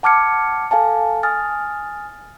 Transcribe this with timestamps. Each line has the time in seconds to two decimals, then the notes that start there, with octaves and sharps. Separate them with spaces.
0.03 F#5 A5 D6 F6 G#6 C#7
0.71 A4 F5 G#5 A5
1.23 G#5 D#6 F6 A6